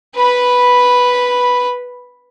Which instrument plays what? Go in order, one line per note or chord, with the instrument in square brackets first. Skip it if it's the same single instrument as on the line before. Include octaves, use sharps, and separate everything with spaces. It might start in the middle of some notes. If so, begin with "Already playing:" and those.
[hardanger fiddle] B4 B5